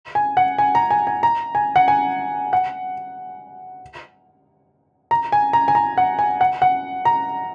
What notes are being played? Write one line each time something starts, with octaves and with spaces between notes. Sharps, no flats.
G#5
F#5
G#5
A#5
G#5
G#5
A#5
G#5
F#5
G#5
F#5
A#5
G#5
A#5
G#5
A#5
F#5
G#5
F#5
F#5
A#5